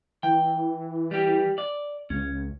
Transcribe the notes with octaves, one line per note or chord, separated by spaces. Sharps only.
E3 G5
G3 G4
D5
C#2 C#4